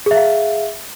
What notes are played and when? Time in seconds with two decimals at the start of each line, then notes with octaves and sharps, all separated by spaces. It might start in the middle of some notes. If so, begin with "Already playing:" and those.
0.06 G#4
0.11 E5
0.16 F5